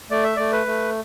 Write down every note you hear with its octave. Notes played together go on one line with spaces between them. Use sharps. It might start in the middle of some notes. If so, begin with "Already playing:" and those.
A3 D5
E5
A3 D5
B4
A3